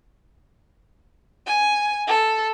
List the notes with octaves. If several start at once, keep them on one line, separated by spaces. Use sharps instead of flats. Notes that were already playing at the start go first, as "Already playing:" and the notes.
G#5
A4